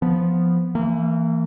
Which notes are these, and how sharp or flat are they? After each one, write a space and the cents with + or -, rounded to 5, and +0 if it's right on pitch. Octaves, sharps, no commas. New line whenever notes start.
F3 +0 B3 +0
E3 +10 A#3 -30